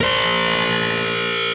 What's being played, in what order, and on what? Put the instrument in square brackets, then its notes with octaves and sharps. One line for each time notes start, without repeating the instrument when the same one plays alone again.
[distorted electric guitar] A#4 C5